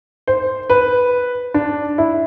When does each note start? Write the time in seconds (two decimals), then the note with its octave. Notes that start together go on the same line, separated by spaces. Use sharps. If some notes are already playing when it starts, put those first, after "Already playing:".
0.27 C5
0.70 B4
1.54 D4
1.98 E4